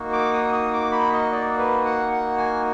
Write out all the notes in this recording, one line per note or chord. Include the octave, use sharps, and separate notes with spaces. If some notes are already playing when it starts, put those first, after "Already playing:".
Already playing: A#3 D#4 F#4
D6
D#6
D#6
D6
B5
D#5
D5
B4
F#5
F#5
G#5